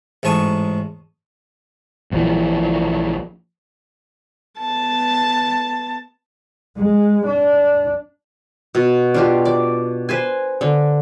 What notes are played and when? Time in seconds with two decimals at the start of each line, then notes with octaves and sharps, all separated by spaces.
0.23 A1 G#2 A5 C#6 D#6
2.11 A#1 A#2 D#3 E3
4.60 B3 A5
6.77 G#3
7.26 D4
8.75 B2
9.14 D4 F4 G4
9.45 D5
10.09 B4 C5 G#5
10.61 D3